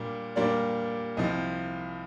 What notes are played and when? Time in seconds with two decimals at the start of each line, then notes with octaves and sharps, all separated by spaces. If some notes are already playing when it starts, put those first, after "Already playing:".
Already playing: A#2 G3 A#3 D4
0.36 A#2 G3 A#3 D4 D5
1.17 C2 C3 F3 D#5